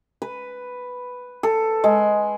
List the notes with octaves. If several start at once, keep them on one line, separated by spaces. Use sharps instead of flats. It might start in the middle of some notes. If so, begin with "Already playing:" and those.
B4
A4
G#3